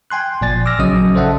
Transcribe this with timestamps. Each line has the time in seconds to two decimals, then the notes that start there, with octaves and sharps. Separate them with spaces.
0.10 G5 G#5 C6 F#6
0.41 G1 A#2 F3 D5 G#5 A6
0.66 D6 E6 F6 A#6
0.79 A#1 C#3 F#3 C#4 D#5 D#6
1.15 A4 C5 D5 E5 F#5 A5